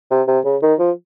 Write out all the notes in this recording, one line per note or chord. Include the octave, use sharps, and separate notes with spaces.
C3
C3
C#3
D#3
F3